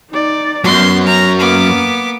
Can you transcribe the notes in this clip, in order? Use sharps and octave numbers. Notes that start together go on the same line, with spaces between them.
D#4 D5
F#2 F#3 B3 C6
A#5
A#3 B3 D6